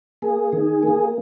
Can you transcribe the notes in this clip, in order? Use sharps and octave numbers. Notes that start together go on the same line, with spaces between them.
A#3 G#4
D#3
A#3